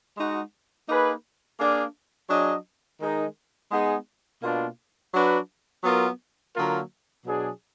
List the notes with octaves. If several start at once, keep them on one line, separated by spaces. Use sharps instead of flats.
G#3 D#4 F#4
A#3 D#4 G#4 B4
A#3 D4 G#4 D5 F5
F#3 D4 G#4 D#5
D#3 G#3 D#4 A#4
G#3 B3 D#4 G#4
B2 A#3 D4 F4
F#3 D4 F#4 B4
F#3 B3 F4 A#4
D3 F#3 A#3 F4 A#4
B2 F#3 D4 G#4